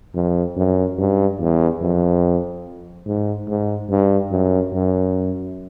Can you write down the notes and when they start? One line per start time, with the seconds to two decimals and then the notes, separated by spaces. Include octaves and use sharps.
0.15 F2
0.56 F#2
0.98 G2
1.40 E2
1.81 F2
3.07 G#2
3.48 G#2
3.90 G2
4.31 F#2
4.73 F#2